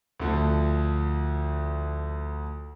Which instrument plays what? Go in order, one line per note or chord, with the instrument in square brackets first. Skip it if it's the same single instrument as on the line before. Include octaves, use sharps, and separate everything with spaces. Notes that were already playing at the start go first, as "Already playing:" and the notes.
[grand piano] D2 D3 F3